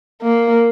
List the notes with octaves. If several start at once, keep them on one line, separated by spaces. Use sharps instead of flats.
A#3